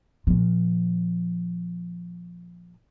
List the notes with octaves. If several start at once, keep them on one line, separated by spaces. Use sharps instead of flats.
A#2 F3